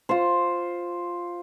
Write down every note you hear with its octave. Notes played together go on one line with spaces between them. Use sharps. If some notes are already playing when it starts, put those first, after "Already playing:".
F4 C5